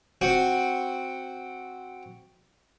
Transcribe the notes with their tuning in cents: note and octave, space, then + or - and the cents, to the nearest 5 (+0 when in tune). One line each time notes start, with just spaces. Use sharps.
C4 +0 F#4 +0 D#6 +0